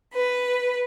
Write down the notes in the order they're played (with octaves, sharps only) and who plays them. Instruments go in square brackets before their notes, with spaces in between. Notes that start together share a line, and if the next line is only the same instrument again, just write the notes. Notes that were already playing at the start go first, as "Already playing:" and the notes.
[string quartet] B4